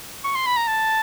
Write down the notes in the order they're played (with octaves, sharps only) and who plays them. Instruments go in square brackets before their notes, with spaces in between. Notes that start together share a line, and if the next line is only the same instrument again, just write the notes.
[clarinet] C#6
C6
B5
A#5
A5